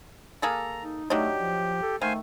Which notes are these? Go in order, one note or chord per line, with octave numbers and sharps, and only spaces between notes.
A#3 G#4 A4 A#5
D#4
F#3 A3 D4 D#4 G4
F3
A4
D#3 A3 C5 F5 G#5